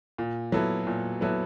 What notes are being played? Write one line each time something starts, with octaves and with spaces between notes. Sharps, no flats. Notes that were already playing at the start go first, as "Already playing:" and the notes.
A#2
F#3 B3 E4 A4
A#2
F#3 B3 E4 A4